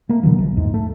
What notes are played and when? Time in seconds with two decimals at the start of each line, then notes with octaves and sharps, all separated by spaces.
0.09 A3 A#3
0.23 B2 D3 E3 F#3
0.38 A#1
0.57 E2 G#2
0.74 A3